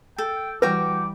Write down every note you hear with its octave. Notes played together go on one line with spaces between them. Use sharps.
A4 G5
E3 G3 F#4 B4 G5 A#5 D6